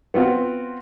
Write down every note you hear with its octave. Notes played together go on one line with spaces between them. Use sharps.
B3 C4 F4 F#4